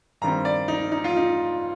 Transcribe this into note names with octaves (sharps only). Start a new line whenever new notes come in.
G2 D#3 G3 C4 A#5
D5
D#4
D#4
F4
D#4